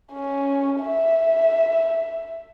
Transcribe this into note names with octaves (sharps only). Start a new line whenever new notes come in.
C#4
E5